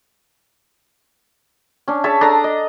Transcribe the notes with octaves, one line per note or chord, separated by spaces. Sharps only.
C#4 D4
G#4 C#5 E5 A5
D4 A4 A#5 D#6
D#5